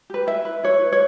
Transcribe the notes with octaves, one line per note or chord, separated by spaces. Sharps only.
G4 B4
E4 E5
B4
E4 C#5
B4
C#5